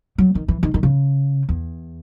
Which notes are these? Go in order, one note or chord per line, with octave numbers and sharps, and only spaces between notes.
F#3
D#3
E3
D#3
D#3
C#3
E2